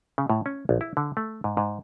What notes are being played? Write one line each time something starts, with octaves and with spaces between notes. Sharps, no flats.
C#3
A2
C#4
A#1
E4
D3
A3
G#2
G#2